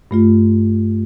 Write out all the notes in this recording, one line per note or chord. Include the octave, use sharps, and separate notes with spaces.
G2 A3 F4